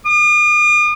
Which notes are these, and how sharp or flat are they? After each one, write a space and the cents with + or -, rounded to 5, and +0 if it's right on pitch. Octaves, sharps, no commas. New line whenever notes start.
D#6 -45